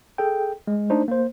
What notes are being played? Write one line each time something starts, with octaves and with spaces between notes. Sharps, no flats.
G#4 A4 G5
G#3
A3 D4 D#4 C5
A#3 C5